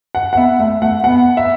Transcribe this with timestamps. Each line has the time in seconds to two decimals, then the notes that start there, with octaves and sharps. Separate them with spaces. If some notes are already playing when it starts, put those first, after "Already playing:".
0.15 F#5
0.33 F#5
0.37 B3 E5
0.59 A3 E5
0.82 A3 F#5
1.04 B3 F#5
1.37 E5